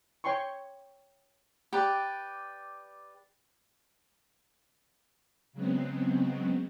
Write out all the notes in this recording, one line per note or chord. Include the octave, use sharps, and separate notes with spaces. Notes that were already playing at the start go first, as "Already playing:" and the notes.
C#5 G5 G#5 C6 C#6
G4 B4 D5
C#3 F#3 G#3 B3 C4